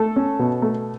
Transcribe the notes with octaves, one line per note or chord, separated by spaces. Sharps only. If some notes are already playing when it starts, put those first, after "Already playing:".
Already playing: A3 A4
C#4
B2
A3